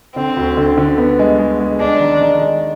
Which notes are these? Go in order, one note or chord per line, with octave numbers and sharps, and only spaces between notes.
D3 C4
D2
D3
D3
B3
G#3
G#3
G#3
G#3 D4
D#3
D#3
G#3